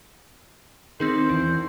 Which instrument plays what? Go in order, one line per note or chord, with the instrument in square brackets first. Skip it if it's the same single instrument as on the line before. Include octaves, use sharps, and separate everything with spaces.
[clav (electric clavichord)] D#3 [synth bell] C4 D#4 G#4 [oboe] C5
[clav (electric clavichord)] E2 [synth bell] E4